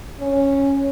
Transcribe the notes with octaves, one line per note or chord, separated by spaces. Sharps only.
C#4